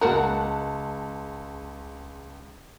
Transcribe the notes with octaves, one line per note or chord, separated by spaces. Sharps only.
C#2 F#4 A#4 A5 F#6